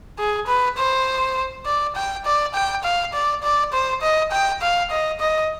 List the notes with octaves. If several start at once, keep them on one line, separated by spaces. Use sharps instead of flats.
G#4
B4
C5
D5
G5
D5
G5
F5
D5
D5
C5
D#5
G5
F5
D#5
D#5